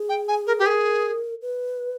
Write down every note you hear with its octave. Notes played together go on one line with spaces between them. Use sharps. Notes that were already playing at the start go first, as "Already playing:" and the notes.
Already playing: G#4
G5
G#5
A#4
G4
B4
G#4 A#4
B4